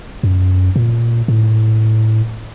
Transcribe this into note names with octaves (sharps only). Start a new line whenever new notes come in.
F#2
A#2
A2